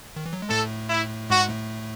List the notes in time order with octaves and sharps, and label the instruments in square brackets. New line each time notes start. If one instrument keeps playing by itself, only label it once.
[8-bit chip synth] D#3
E3
F#3
G#3
[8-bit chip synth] A2 A3 [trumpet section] A4
[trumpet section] E4
[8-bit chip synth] G#2 G#3 [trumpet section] F#4
[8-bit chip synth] A2 A3